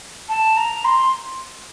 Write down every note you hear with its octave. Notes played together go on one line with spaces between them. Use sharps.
A5
A#5
C6